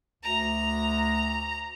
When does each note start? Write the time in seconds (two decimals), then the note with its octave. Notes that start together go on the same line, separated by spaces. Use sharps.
0.23 D2 A#5